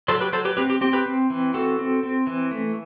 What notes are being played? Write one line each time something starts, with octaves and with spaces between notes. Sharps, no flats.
F#3 A4 C5
G4 B4
F#3 A4 C5
G4 B4
C4 G4 B4
G4
C4 G4
G4 B4
C4
E3
C4 F#4 A4
C4
C4
E3
A3